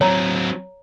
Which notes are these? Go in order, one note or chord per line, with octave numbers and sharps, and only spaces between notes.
F#3 C4 C#5 A#5